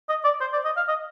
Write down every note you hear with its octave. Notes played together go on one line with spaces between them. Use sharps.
D#5
D5
C5
D5
D#5
F5
D#5